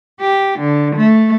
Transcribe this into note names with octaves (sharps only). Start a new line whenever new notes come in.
G4
D3
A3